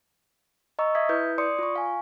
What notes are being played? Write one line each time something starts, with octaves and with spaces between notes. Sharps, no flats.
D#5 A#5 C#6 E6
E5 D#6 G#6 B6
E4 B4 G6
D5 C6 D#6 C#7
F4 C#6
F5 G#5